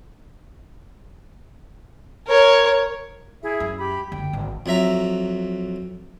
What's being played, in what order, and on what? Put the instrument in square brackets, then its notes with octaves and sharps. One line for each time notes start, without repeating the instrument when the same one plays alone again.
[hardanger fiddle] A#4 C#5
[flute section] E4 G#4 E5
[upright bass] F#2
[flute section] G4 B5
[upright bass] F#1 D2 [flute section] G5
[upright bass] G#1
[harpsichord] F2 F#3 E5 A#5